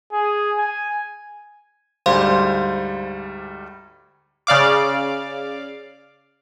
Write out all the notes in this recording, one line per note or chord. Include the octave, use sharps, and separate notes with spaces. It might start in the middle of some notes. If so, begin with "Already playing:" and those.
G#4
G#5
D2 G#2 G3 C5 F5 C6
C#3 D5 F5 D6